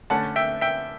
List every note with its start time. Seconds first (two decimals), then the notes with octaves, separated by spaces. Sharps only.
0.10 D3 A3 C#4 F#5 A5
0.36 E5 G5
0.61 E5 G5